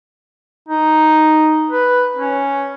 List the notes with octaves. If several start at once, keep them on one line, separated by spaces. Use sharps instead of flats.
D#4
B4
C#4